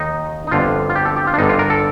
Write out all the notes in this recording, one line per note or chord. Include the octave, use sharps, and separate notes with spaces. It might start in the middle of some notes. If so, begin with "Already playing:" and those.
Already playing: D#2 D#3 D#4
D#4
G1 F2 D3 F4
F4
G4
A4
G4
F4
D4
G1 G2 D3 D#4
F4
A#4
A4